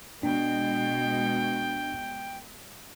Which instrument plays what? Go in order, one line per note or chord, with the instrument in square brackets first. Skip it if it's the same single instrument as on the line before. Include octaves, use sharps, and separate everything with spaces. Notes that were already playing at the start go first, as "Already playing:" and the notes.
[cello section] B2 G#3 [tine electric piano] D4 [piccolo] G5